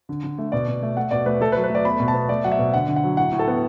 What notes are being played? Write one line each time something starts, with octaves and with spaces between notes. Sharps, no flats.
D3
D3
A3
B2 D5
B2
A3
A3 F#5
B2 D5
A3 B4
A3 A4
B4
F#3
B4
A3 D5
B3 B5
B2
A5
B3
A3 D5
F#3 F#5
E5
B2
D3 F#5
D3
F#5
F#3
A2 F#5
A2
A4
B3